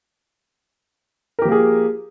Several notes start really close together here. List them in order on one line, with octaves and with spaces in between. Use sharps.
A#4 G4 F3 A#3 G#4